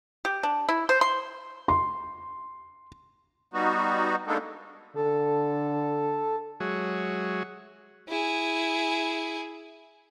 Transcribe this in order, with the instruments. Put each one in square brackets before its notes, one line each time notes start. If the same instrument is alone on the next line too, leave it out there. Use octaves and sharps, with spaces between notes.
[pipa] G4
D4
E4
C5
C6
[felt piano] C6
[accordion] G3 B3 D#4 F#4
G#3 A#3 B3 D4 D#4 A4
[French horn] D3 [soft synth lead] A4
[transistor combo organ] F#3 G#3 F#4 G#4 C#5 E5
[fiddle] E4 G#4